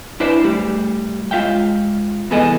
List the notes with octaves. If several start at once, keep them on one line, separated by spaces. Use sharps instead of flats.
D4 E4 B4 C5 D5 E5
G3 A3 G4
G#3 F4 E5 F5 G5
C2 E3 B3 G#4 A4 D#5